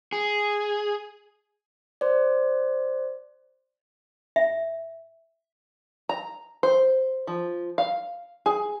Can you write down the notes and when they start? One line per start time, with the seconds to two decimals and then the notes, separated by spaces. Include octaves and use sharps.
0.12 G#4
2.01 C5 D5
4.36 E5
6.09 A#5
6.63 C5
7.27 F3
7.78 F5
8.46 G#4